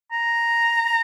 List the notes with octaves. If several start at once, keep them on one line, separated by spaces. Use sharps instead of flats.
A#5